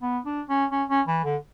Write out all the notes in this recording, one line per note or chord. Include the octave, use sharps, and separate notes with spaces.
B3
D4
C#4
C#4
C#4
E3
D3